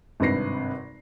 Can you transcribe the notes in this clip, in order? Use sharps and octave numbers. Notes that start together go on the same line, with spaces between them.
G#1 G2 C3 B4 A#6 C7